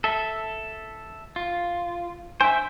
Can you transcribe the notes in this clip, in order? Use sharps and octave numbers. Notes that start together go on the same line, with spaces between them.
A4 E5
F4
C5 E5 G#5